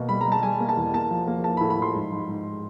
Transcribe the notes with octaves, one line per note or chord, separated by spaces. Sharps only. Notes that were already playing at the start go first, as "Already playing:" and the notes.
Already playing: B2 A#3
G3 B5
A#5
G3
A5
G3 G#5
A#3
A5
E2
A#3 A5
F3
A#3
A#3 A5
A2 B5
B5
F3 C6
G#2
G#2
G#2